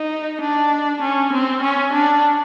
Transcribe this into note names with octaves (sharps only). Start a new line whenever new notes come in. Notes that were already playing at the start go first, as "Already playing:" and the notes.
Already playing: D#4
D4
C#4
C4
C#4
D4